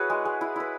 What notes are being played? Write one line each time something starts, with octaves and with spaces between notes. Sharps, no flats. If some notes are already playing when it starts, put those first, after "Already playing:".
Already playing: E4 F#4 G#4 B4 C#5
G#3
G#3
E4
E4 B4